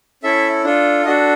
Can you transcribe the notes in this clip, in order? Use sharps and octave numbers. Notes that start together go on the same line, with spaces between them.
C#4 E4 A4 E5
D4 F4 A4
D4 F#4 A4 D#5